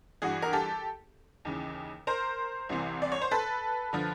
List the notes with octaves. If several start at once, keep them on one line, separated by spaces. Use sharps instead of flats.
G2 E3 F#4 G#4
A#4
G4 A4
D#2 C#3 E3
A#4 C5
C2 C3 E3
D5
C#5
C5
A4 B4
D3 F3